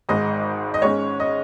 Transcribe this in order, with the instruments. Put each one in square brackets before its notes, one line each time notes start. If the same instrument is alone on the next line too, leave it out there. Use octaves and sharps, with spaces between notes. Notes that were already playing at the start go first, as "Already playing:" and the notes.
[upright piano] G#1 G#2 G#3 D#5
D#5
G#2 G#3 C#4 C#5
D#5